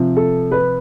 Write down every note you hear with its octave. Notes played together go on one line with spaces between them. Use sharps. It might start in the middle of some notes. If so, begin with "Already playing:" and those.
Already playing: C3 F3
A4
B4